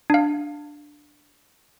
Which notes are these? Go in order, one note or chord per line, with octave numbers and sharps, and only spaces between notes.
D4 F5